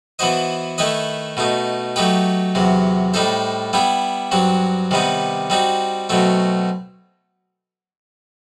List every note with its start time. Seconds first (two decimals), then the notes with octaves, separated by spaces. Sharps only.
0.19 E3 B3 F#4 C5 D#5
0.78 D#3 A3 E4 B4 D#5
1.37 B2 A3 D#4
1.96 F#3 A3 D#4 G4 B4
2.55 E2 C3 F#3
3.14 A2 G3 D#4 A4 C5
3.73 G3 B3 E4 G4
4.32 G2 F#3 C4 F#4
4.91 C3 D#3 G3 B3 D#4
5.50 G3 C4 D#4 F#4
6.09 B2 F#3 A3 C4